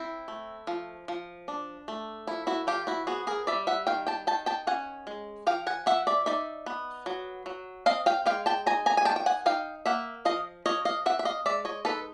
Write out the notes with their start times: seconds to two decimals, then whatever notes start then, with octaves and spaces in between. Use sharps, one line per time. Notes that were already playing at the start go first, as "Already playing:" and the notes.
Already playing: C4 E4
0.28 A3
0.67 F3
1.08 F3
1.48 D4
1.88 A3
2.27 F3 E4
2.47 E4 F#4
2.67 F3 F4 G4
2.87 E4 F#4
3.07 B3 F#4 G#4
3.27 G#4 A#4
3.47 G3 D5 E5
3.67 E5 F#5
3.87 D#3 F5 G5
4.07 G5 A5
4.27 D#3 G5 A5
4.46 G5 A5
4.67 C#4 F#5 G#5
5.07 G#3
5.47 F3 F5 G5
5.67 F#5 G#5
5.86 F3 E5 F#5
6.07 D5 E5
6.26 D#4 D5 E5
6.66 B3
7.06 F#3
7.46 F#3
7.86 C4 D#5 F5
8.06 F5 G5
8.26 G#3 F5 G5
8.46 G5 A5
8.66 D#4 G#5 A#5
8.86 G#5 A#5
8.97 G#5
9.05 D#3 G5 A5
9.16 G5
9.26 F#5 G#5
9.46 D#4 F5 G5
9.86 A#3 E5 F#5
10.25 F3 D#5 F5
10.66 F3 C#5 D#5
10.85 D#5 F5
11.06 C4 E5 F#5
11.19 E5
11.25 D#5 F5
11.46 G#3 D5 E5
11.65 C#5 D#5
11.85 D#4 A4 B4